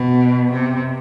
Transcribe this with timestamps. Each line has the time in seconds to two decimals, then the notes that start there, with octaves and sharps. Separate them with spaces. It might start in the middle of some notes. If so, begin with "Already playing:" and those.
Already playing: B2
0.51 C3